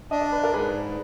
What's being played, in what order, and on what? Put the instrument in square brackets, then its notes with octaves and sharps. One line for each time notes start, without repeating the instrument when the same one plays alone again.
[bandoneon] D4 [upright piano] D#5
[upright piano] D5
B4
A#4 D5
[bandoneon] G#2 [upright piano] G#4 B4